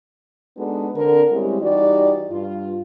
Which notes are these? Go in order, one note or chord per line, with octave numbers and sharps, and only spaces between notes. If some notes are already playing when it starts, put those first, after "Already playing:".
G#3 B3 D4 D#4 F#4 A4
D3 C4 A#4
G3 G#3 C4 C#4 E4 G4
E3 G3 D#4 F#4 G4 D5
G2 F4